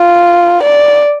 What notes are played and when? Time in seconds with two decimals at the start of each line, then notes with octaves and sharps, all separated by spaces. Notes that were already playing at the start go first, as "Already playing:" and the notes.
Already playing: F4
0.63 D5